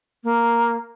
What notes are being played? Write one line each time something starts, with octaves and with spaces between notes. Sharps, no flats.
A#3